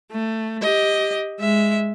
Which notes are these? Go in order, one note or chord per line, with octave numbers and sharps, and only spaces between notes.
A3
G4 D#5
G#3 E5